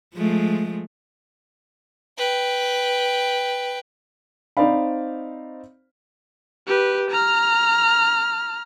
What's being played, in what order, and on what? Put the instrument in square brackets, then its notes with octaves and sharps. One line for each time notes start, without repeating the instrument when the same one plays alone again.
[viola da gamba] F3 G#3 A3
[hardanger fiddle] B4 G5
[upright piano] C4 D#4 C5 D5 F5 B5
[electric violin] G4 B4
A#5 F6